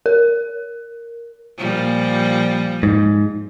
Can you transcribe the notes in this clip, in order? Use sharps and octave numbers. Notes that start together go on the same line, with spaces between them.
A#4
A#2 F3 G3
G#2